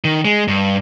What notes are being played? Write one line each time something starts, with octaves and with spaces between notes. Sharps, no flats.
D#3
G#3
G2